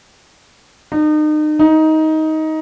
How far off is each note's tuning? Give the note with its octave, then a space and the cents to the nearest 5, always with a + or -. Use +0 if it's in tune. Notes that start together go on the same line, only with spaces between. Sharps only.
D#4 -35
D#4 +15